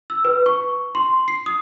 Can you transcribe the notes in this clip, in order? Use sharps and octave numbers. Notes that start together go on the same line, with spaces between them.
E6
B4
C#6
C6
C7
D#6